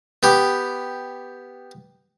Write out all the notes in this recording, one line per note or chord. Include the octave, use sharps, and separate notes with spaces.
B3 G4